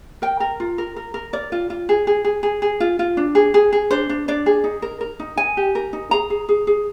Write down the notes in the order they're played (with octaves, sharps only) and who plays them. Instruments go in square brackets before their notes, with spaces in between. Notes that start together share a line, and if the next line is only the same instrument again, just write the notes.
[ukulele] A#4 G5
A#4
F4
A#4
A#4
A#4
A#4 D5
F4
F4
G#4
G#4
G#4
G#4
G#4
F4
F4
D4
G#4
G#4
G#4
D4 C5
D4
D4 D5
G#4
D#4
A#4
A#4
D#4
D#4 G#5
G4
A#4
D#4
G#4 A#5
G#4
G#4
G#4